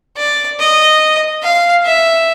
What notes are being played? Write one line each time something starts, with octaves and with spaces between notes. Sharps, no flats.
D5
D#5
F5
E5